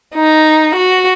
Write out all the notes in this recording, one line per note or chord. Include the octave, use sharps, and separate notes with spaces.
D#4
F#4